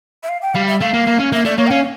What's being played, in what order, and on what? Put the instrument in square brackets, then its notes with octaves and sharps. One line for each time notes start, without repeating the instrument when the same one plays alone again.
[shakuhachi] E5
F5
G5
[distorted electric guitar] G3 [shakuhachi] F5
[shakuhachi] E5
[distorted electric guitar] A3 [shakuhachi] F5
[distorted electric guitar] A#3
A#3
C#4
[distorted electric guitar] A#3 [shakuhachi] E5
[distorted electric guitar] A3 [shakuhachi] D5
[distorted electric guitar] A#3 [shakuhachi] C#5
[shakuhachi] G5
[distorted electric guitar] C#4 [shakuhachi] F5